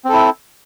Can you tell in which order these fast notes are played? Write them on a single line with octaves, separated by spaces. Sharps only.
C4 A4 E4